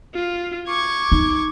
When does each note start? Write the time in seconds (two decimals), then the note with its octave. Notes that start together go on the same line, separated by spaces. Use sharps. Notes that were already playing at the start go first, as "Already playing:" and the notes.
0.15 F4
0.68 C#6 D6 G#6
1.12 D#4